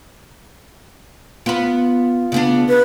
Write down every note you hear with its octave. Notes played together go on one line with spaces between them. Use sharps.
B3 F4 B4
C#3 B3 D4
B4